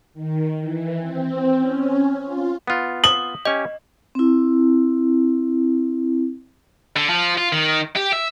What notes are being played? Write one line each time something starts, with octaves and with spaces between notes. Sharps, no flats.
D#3
E3
C4
C#4
F4
B3 F4
D#6 F#7
C#4 G4 D#5
C4 E4
D3
F3
F4
D#3
G4
E5